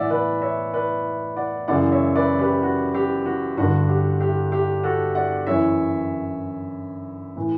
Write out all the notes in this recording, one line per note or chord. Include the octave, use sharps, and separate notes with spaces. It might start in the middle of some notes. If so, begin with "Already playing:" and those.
Already playing: A2 E3 D5 E5 F#5
B4 D5
C#5 E5
B4 D5
D5 F#5
F#2 C#3 E3 D5 F#5
C#5 E5
B4 D5
G4 B4
F#4
G4
F#4
G2 D3 F#4
G4
G4
G4
F#4 A4
D5 F#5
F#2 E3 C#5 E5
A2 E3